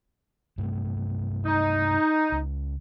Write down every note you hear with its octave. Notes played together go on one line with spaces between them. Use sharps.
G2 C3 A3
D#4
C#2